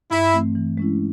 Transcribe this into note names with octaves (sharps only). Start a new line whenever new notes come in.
G2 E4
E3 A3 C4
E3
G#3 C#4 E4